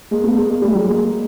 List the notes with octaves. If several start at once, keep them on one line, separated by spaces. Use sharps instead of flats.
G#3 A#3
A3 B3
G#3 A#3
G#3 A#3
G3 A3
F#3 G#3
G#3 A#3